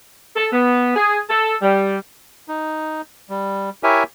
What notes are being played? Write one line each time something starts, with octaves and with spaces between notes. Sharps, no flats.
A4
B3
G#4
A4
G3
D#4
G3
E4 G4 A#4 C#5 E5 G#5